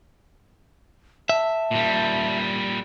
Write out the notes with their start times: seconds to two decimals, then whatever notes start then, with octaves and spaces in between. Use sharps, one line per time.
1.29 E5 A5
1.71 A#2 G3